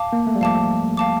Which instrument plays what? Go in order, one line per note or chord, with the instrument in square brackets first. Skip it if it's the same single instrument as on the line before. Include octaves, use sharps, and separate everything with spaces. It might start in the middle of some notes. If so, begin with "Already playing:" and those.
Already playing: [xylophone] F5 A5 D6
[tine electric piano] A#3
A3
G3
[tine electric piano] F3 [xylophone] F5 A5 D6
[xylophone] F5 A5 D6